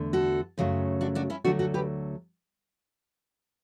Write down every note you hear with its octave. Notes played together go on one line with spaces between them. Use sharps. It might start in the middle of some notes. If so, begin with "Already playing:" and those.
Already playing: E2 D3 A3
F#4 A4
F#2 C#3 F#3 A3
D4 F#4
D4 F#4
C#4 E4
D2 D3 F#3 A3 D4 F#4
F#4 A4
G4 B4